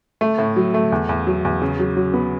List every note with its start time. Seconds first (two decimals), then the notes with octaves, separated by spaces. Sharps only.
0.21 A3
0.38 A2
0.56 F#3
0.74 A3
0.92 E2
1.09 E2
1.27 F#3
1.45 E2
1.62 C#3
1.79 F#3
1.97 F#3
2.14 B3